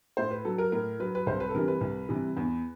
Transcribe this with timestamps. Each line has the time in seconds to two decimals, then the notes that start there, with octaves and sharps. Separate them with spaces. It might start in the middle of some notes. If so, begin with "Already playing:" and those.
0.17 A2 C5
0.31 B4
0.45 F#3 A4
0.58 A#4
0.72 A2 A#4
1.00 F#3 B4
1.15 B4
1.26 C2 C5
1.40 B4
1.49 A4
1.54 C3 E3 G3 A#4
1.68 B4
1.81 C2
2.09 C3 E3 G3
2.37 E2